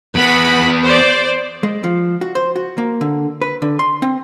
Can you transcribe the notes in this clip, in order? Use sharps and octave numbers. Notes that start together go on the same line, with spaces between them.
E2 B3 F#5 B5
C5 D5
G#3
F3
F#4
C5
F#4
A#3
D3
B4
D3
C6
C4